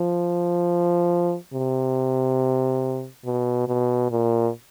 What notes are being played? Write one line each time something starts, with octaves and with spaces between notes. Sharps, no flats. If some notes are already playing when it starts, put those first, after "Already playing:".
Already playing: F3
C3
B2
B2
A#2